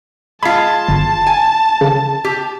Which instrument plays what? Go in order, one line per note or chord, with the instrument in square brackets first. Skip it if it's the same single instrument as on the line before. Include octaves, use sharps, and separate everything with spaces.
[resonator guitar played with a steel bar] G#3 F4 [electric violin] A5 [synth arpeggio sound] B5 B6
[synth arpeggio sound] G1
[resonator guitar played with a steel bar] G#5
[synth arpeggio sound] C#3
[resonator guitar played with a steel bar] G4